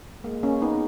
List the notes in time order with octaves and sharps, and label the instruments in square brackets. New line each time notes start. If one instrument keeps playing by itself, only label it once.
[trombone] G#3 [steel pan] A#3
[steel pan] A#3 C#4
B3 D#4